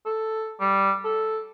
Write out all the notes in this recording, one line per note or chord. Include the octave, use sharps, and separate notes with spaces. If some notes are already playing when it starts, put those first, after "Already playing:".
A4
G3
A4